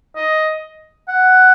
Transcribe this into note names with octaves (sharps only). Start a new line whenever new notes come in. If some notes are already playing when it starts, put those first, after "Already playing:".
D#5
F#5